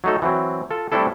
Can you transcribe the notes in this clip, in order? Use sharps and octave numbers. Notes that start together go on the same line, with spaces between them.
F#3 A3 D#4 A4
E3 F#3 C4
F4 A4
G3 A3 C4 D4 E4 A4